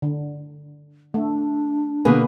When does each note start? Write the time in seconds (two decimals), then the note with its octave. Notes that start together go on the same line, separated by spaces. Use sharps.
0.02 D3
1.14 A3 D4
2.05 B2 D3 A#3 B3 G#4 B4